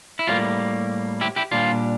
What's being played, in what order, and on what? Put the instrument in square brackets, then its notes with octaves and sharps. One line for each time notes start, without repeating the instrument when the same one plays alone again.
[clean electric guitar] E4
A2 G3 A#3 F4
E4 G4
E4 G4
A#2 G3 D4 F4